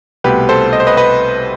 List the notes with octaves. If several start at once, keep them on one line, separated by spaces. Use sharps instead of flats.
C2 B2 A3 G4 B4
A4 C5
D#5
C5
B4 D#5
B4 D#5